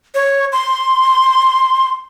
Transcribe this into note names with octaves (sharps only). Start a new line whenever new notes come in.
C#5
C6